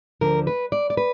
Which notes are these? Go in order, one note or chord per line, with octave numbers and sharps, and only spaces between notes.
D2 D3 F3 A#4
B4
D5
D5
B4